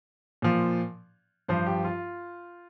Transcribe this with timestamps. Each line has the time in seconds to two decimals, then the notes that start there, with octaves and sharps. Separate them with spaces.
0.42 A#2 F3
1.48 G2 F3 C5
1.66 G4
1.85 F4